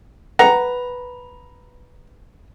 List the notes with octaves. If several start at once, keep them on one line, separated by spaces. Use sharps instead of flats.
B4 F#5 A#5